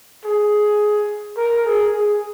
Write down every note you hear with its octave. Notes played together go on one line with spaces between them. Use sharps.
G#4
A#4
G#4
G#4